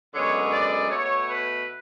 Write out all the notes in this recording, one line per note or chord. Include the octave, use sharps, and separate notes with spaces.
F#2 D3 G#3 B3 C#5
D5
B2 A3 C#5
B4